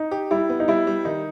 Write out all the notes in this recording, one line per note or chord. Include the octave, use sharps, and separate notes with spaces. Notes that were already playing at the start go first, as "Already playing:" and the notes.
Already playing: D#4
G4
G3 E4
B3
D#4
G3 E4
G3
D#3 D#4